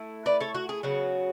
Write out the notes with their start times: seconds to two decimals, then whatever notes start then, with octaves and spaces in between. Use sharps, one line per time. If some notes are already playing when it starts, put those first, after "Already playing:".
Already playing: A3 E4
0.26 B4 D5
0.40 A4 C#5
0.55 F#4
0.69 G#4
0.83 C#3 F#3 B3 F#4